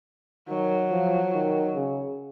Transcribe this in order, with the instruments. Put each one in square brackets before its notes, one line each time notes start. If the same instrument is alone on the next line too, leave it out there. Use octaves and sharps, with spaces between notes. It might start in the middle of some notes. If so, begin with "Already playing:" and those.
[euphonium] D#3 [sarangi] F#3
[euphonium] F3
D#3
C#3